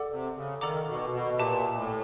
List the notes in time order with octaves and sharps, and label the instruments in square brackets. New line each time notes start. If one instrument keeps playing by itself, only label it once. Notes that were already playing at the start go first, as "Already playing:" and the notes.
Already playing: [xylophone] A4 D5 F#5 D6
[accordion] C3
C#3
[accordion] D#3 [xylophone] A4 D5 F#5 A#5 D6
[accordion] B2
B2
[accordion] A#2 [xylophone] G4 B4 E5 A5 D6
[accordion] A2